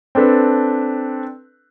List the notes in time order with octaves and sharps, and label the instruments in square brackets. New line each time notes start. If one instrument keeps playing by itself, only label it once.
[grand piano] C4 D4 A4 B4